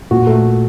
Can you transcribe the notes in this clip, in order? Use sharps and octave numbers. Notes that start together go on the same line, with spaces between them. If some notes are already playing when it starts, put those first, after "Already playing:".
A#2 F#4
A3